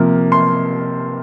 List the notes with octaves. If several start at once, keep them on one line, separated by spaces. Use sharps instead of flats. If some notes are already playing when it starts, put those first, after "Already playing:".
Already playing: C3 F3 A#3
C6